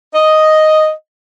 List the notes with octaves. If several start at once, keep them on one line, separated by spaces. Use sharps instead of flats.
D#5